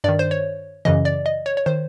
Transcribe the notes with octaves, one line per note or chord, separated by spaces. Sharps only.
G2 D#3 D5
C5
C#5
F#2 C#3 E3 D#5
D5
D#5
C#5
C#5
D#3 C5